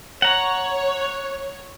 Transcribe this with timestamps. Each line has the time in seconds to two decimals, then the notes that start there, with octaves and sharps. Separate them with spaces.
0.22 C#5 F#5 A#5